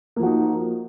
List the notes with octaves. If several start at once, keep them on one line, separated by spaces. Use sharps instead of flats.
F3 A#3 D#4 F#4